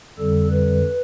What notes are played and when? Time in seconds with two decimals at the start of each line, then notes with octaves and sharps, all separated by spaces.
0.19 F2 D3 G3 A4
0.51 B4